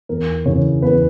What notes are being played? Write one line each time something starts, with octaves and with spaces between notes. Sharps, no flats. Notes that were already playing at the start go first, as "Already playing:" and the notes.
E2 A#4
C#3 E3 C#5
E2 B4